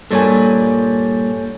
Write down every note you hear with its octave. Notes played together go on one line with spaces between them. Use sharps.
G2 A#2 G3 A4 C#5 G#5